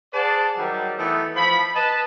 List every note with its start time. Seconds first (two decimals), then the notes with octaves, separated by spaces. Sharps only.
0.13 G#4 C5 D5 F#5 A5
0.58 D#3 F#3 G3
0.98 E3 A3 B3 D#4
1.36 F3 B5
1.75 B4 D#5 A5